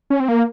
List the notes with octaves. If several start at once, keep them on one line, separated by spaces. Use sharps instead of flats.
C#4
C4
A#3